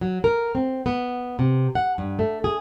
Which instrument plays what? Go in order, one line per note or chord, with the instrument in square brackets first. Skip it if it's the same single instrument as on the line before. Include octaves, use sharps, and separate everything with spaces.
[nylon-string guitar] F#3
A#4
C4
B3
C3
F#5
G2
A3
G#4